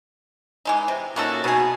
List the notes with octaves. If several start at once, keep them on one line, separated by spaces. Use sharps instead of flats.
E3 G#3 D#4
C3
A#2 A#3 C#4 D#4 F#4 A4
B2 D#4 G#4